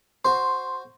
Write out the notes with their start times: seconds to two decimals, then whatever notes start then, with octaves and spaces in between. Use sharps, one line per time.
0.25 F#4 C5 C6